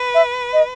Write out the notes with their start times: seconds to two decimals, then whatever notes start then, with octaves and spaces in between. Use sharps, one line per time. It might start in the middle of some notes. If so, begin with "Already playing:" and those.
Already playing: B4
0.15 E5
0.53 D#5